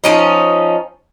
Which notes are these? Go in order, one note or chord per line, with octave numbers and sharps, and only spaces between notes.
F3 C#4 D#4